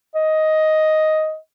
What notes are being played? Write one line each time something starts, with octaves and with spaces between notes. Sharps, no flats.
D#5